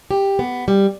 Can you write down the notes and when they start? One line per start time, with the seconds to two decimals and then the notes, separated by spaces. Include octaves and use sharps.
0.11 G4
0.39 B3
0.68 G3